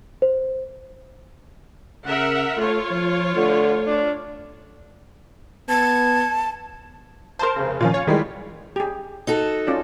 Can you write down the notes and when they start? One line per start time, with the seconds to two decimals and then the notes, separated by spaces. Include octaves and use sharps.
0.22 C5
2.07 C#3 A#4 E5 F#5
2.58 A3 F4 C#5
2.91 F3
3.37 D3 A3
3.87 D4
5.69 B3 A5 G#6
7.39 A#4 C5 A5 C6
7.56 F1 C#3
7.81 A#2 D#3 F3 C#4 F4
7.94 C#5
8.07 D#3 E3 G3 G#3
8.76 G4 G#4
9.27 D#4 F#4 A4
9.67 C#4 F4 D5